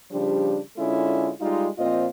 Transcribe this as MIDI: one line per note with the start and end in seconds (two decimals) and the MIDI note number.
0.11 0.58 49
0.11 0.58 53
0.11 0.58 55
0.11 0.58 62
0.11 0.58 67
0.77 1.30 50
0.77 1.30 56
0.77 1.30 61
0.77 1.30 64
0.77 1.30 65
0.77 1.30 69
1.39 1.67 55
1.39 1.67 56
1.39 1.67 63
1.39 1.67 65
1.78 2.06 46
1.78 2.06 53
1.78 2.06 60
1.78 2.06 65
1.78 2.06 72
1.78 2.06 75